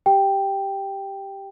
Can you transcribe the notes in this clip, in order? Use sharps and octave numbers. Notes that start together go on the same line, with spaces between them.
G4 G5